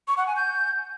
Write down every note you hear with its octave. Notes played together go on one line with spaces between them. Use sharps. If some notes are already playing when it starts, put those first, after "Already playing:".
C#6
F#5
G#5
G6